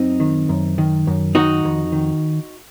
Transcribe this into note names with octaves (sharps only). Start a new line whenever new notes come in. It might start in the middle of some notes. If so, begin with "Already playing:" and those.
Already playing: F#2 C4 D#4
D#3
F#2
D#3
F#2
D#3 D#4 F#4
F2
D#3